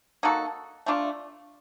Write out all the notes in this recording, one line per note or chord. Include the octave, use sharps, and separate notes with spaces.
A#3 D#4 F#4 A4
A3 D4 F4